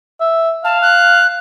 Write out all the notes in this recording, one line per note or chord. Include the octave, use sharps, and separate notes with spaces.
E5
F5 A5
F#6